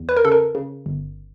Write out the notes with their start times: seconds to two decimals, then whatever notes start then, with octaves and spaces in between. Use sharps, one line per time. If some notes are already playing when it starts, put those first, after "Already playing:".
Already playing: E2
0.09 B4
0.16 A#4
0.25 C#3 A4
0.32 A#4
0.55 C#3
0.86 G1